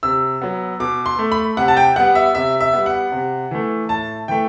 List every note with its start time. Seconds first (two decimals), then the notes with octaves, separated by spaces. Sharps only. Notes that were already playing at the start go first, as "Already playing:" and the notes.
0.03 C3 E6
0.42 F#3 B3
0.80 B2 D6
1.06 C6
1.19 A3
1.32 B5
1.57 C3 F#5
1.68 A5
1.77 G5
1.96 G3 B3 F#5
2.15 E5
2.35 C3 E5
2.61 E5
2.73 G3 B3
2.86 F#5
3.12 C3
3.51 E3 A3
3.89 A2 A5
4.28 E3 A3 G5